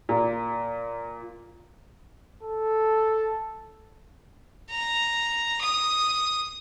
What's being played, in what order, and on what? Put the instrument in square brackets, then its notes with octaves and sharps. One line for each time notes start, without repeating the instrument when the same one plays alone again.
[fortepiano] A#2
[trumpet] A4
[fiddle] A#5
D#6